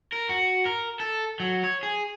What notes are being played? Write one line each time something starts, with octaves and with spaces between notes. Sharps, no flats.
A#4
F#4
A#4
A4
F#3
C#5
G#4